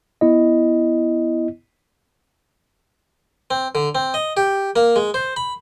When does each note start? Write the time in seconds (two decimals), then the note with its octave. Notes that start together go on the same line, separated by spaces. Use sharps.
0.21 B3 E4 D#5
3.51 C4
3.75 D3
3.95 C4
4.14 D#5
4.37 G4
4.76 A#3
4.96 G#3
5.14 C5
5.37 B5